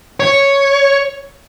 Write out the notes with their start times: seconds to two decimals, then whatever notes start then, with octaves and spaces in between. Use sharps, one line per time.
0.20 C#5